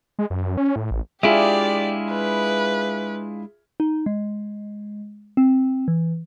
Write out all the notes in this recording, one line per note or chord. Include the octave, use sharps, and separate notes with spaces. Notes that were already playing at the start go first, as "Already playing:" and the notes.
G#3
F#2
C#4
A2
A1
G#3 D4 E4 F4 G4 G#4 D5 E5
B4
D#4
G#3
C4
E3